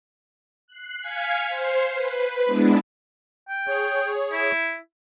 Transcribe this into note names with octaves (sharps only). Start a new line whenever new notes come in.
F#6 C7
F5 G#5 F6 G#6 B6 C#7
C5 C7
B4
G#3 B3 D4 E4
G5
G#4 C#5
E4